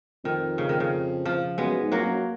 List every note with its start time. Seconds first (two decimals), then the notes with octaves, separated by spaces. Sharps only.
0.25 F2 D#3
0.58 C#3
0.69 D#3
0.80 C#3
1.25 F3
1.58 F#2 G#3 B3
1.81 G#2
1.92 F2 F#3 A#3
2.03 F#2